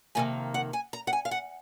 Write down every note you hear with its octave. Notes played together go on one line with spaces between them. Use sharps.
F2 C3 D#3 A#3 G#5
F#5
G#5
A#5
F#5
G#5
F5
F#5